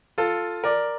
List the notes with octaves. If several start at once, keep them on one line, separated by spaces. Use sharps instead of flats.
F4 A4
A#4 D5